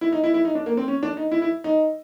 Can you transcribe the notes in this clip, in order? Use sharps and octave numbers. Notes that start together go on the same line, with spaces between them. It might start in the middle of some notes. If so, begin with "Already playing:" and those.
E4
D#4
E4
E4
D#4
D4
A#3
C4
C#4
D4
D#4
E4
E4
D#4